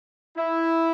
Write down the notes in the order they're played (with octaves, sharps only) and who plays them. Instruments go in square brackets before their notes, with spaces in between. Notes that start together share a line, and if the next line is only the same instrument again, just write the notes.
[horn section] E4